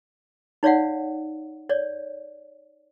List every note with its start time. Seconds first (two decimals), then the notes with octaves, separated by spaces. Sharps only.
0.63 D#4 C#5 D5 F5 F#5
1.69 C#5 D5